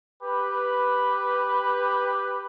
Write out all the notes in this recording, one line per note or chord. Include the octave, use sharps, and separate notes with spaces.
G4 B4